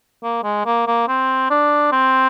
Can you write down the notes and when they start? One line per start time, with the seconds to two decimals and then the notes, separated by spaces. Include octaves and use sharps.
0.24 A#3
0.44 G#3
0.66 A#3
0.87 A#3
1.08 C4
1.50 D4
1.92 C4